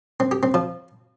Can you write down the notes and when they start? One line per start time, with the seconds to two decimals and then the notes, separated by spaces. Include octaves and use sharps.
0.20 C4
0.31 G4
0.43 C4
0.54 F3